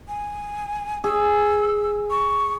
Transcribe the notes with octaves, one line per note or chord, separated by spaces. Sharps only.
G#5
G#4 E6
C#6